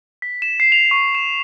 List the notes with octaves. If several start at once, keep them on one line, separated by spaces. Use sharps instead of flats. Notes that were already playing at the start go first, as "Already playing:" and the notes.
B6
E7
C7
F7
C#6
E7